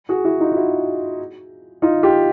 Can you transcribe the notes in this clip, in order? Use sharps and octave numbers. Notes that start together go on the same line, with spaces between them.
F#4 G#4
E4 F#4
D#4 F4
F4
E4 F#4
D#4 F4
F4 G4